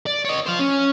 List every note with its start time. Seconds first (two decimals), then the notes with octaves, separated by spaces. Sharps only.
0.07 D5
0.25 C#5 D#5
0.46 C5 F5
0.59 C#4